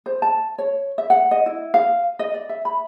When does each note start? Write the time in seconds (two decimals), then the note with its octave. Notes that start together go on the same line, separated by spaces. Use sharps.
0.06 C5
0.22 A5
0.58 C#5
0.98 E5
1.10 F#5
1.31 D#5
1.46 E4
1.74 F5
2.19 D#5
2.34 D5
2.49 E5
2.65 B5